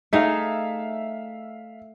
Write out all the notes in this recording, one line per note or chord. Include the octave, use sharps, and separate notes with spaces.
A3 D#4 G#4 E5 F5